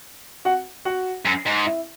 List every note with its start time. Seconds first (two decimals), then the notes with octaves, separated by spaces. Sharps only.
0.45 F#4 F#5
0.85 F#4 F#5
1.25 F#2
1.46 G#2
1.66 E4 E5